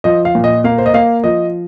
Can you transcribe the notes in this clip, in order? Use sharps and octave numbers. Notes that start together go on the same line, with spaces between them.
F3 D#5
F5
A#2
D#5
A#3 F5
C5
D#5
A#3 F5
F3 D#5